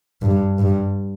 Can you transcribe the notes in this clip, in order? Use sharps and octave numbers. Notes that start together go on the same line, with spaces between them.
G2
G2